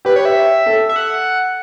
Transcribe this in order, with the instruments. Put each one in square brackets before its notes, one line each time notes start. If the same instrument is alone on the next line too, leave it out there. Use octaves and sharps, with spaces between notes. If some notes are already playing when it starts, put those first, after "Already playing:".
[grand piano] G4 [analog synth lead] B4
[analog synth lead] C#5
E5
[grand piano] A4
[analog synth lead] E5
F#5